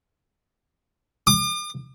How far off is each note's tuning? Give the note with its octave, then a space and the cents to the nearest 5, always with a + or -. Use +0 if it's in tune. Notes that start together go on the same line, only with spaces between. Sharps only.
D6 +45